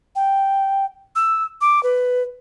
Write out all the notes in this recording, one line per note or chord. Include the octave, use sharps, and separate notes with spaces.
G5
E6
D6
B4